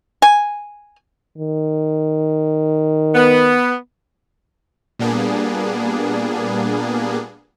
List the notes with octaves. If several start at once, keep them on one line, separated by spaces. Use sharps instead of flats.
G#5
D#3
B3
A#2 G3 A#3 B3 D4 G#4